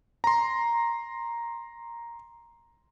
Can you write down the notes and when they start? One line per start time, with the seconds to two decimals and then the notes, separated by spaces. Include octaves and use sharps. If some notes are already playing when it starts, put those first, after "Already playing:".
0.24 A#5 C6